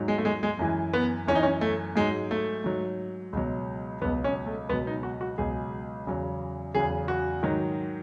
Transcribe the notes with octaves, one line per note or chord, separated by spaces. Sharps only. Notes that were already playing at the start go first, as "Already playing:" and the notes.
Already playing: G#2 F#3
G#3
A3
G#3
G#3
F#2 E3
B3
F#2 E3 C#4
D#4
C#4
A3
G#2 F#3 G#3
A3
G#2 F#3
C#2 B2 F#3
C#2 B2 F#3 B3
C#4
A3
C#2 B2 F#3 B3
D#4
F#4
F#4
C#2 B2 F#3 G#4
E2 C#3 F#3
E2 C#3 F#3 G#4
F#4
G#2 D#3 F#3